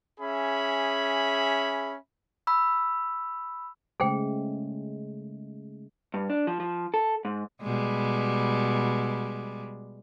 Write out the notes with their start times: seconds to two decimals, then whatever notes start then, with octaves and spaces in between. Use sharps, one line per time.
0.20 C#4 G#4 E5 B5
2.47 B5 E6
4.00 C#3 G#3 A3 G#4 C5 G5
6.14 G2
6.30 D4
6.47 F3
6.60 F3
6.94 A4
7.25 G#2
7.63 B2 G3 G#3